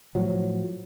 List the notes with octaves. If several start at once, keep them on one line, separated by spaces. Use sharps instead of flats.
A2 F3 F#3